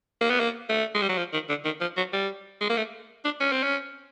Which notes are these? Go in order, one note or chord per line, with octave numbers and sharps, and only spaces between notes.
A#3
B3
A#3
A3
G#3
G3
F#3
F3
D#3
D3
D#3
F3
F#3
G3
G#3
A#3
A3
D4
C#4
C4
C#4